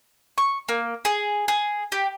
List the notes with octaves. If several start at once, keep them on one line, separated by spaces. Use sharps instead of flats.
C#6
A#3
G#4
G#4
G4